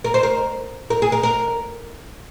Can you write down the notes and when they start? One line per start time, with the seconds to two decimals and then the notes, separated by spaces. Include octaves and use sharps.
0.04 A#4
0.14 C5
0.23 A#4
0.90 A#4
1.02 G#4
1.12 A#4
1.23 A#4